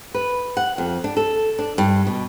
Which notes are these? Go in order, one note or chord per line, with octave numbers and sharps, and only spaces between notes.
B4
F#5
F2
D4
A4
D4
G2
B2